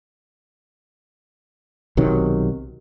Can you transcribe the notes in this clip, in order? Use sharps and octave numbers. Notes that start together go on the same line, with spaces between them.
B1 C3 D#3 F#3